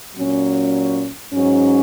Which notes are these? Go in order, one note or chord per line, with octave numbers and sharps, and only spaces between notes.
A#2 F#3 C#4
G#2 F#3 C#4